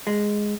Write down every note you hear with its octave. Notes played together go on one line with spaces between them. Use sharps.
G#3